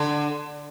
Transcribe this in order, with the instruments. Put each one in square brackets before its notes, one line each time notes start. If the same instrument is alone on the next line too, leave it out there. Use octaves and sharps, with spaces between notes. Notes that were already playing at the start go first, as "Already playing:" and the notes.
Already playing: [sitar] D3